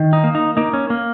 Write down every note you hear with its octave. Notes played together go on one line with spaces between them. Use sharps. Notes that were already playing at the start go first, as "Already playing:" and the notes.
Already playing: D#3
D#4
A#3
D#4
A#3 D#4
C#4
A#3